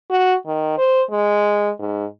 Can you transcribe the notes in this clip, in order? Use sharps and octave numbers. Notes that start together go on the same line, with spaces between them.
F#4
D#3
C5
G#3
G#2